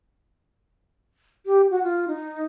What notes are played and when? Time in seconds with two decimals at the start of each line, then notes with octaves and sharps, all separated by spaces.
1.46 G4
1.71 F#4
1.84 F4
2.08 D#4